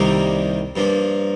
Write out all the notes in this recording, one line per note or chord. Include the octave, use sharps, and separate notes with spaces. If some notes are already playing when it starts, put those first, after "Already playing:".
Already playing: C2 C3 D#3 G3 A#3
G2 F3 A#3